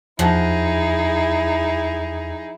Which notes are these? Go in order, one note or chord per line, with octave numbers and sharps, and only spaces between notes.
E2 F3 D#4 E4 G#4 F#5